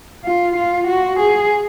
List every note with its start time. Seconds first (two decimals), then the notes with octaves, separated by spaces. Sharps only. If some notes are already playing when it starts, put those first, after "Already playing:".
0.25 F4
0.57 F4
0.88 F#4
1.20 G#4